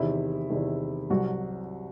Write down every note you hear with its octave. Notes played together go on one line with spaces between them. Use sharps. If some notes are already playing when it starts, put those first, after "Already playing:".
Already playing: E2 C3 D#3 E4
E2 C3 D#3
C2 C3 F#3 F#4